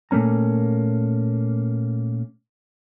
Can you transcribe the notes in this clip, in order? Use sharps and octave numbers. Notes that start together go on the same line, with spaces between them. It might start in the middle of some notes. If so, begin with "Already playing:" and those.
A#2 A3 A#3 C#4 A#5